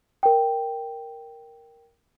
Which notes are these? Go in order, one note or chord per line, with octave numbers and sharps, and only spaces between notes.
A#4 G5